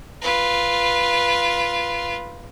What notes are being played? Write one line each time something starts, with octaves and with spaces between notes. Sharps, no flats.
F4 B4